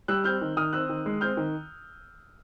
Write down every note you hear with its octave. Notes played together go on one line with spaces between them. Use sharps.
G3 E6 F#6
C4 F6 G6
D#3
D#3 D#6 F6
C4 E6 F#6
D#3
G#3
C4 F6 G6
D#3